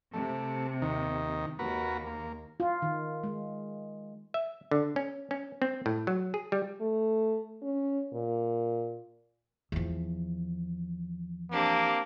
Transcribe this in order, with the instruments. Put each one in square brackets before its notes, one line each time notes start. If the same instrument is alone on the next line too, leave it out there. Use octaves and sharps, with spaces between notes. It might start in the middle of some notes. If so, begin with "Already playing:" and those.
[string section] C3 [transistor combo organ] A3
[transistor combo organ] D#2 D#3
[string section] D#2 [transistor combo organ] F#4 A#4 B4
[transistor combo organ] A#3
[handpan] F4
D#3
G#3
[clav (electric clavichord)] E5
D3
C#4
C#4
C4
A2
F#3
G#4
G3
[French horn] A3
C#4
A#2
[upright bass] E2 F3
[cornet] A#3 [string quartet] C4 D4 G4